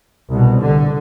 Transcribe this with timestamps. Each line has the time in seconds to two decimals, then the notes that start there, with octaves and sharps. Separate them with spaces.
0.30 C2 B2
0.59 D3